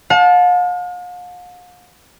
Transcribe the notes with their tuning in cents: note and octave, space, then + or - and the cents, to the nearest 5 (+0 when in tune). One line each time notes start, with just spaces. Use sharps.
F5 +45 A5 -15